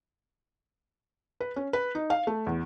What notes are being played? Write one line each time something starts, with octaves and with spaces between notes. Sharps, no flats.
B4
C#4
B4
D#4
F5
A3
E2